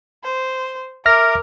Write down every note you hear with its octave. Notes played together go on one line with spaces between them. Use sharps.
C5
A#4 E5 D6 F6 A#6